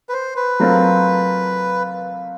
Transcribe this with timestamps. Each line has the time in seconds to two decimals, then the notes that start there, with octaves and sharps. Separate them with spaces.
0.09 B4
0.13 C5
0.36 B4
0.60 F#3 A3 C4 F4 A#4